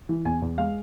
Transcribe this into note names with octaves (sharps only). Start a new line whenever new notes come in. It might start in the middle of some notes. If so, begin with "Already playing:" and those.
E3
E2 G#5
E2
G#3 F5